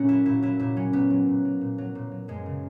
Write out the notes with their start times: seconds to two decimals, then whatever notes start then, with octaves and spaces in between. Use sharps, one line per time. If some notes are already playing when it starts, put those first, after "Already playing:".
Already playing: A#2 C#4 F#4
0.09 F#3 E4
0.26 A#2 E4
0.42 F#3 E4
0.59 A#2 E4
0.76 F#3 C#4
0.93 A#2 B3
1.10 F#3
1.28 A#2
1.45 F#3
1.61 A#2
1.78 F#3
1.95 A#2
2.11 F#3
2.28 F#2 G#3
2.46 C#3